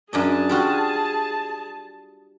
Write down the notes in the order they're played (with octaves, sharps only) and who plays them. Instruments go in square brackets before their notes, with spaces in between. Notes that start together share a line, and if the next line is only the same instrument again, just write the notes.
[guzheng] F#2 D4 D#5 [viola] G#4 A5
[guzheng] G3 F4 F#4